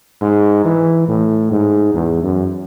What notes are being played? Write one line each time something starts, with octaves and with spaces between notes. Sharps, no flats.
G#2
E3
A2
G#2
E2
F#2